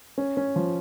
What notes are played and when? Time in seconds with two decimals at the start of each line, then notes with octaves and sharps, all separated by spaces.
0.18 C#4
0.37 C#4
0.56 F3